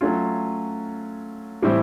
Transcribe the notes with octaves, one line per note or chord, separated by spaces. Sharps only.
F#3 A3 C#4 F4
A2 E3 G3 C4 E4